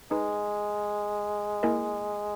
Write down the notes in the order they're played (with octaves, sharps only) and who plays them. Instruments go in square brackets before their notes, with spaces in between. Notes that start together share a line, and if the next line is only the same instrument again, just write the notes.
[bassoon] G#3 [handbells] D#4 G#4 B4
[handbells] A#3 E4 A#4 D#5 G#5